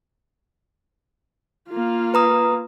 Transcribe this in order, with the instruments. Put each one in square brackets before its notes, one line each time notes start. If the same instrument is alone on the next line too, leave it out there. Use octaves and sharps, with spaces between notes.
[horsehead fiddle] A#3 F4
[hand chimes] B4 A#5 D#6